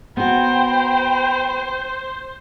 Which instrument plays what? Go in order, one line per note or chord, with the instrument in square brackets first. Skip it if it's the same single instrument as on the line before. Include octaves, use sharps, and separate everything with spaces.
[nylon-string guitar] B3 F#4 [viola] C5 [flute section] G5 A#5 B5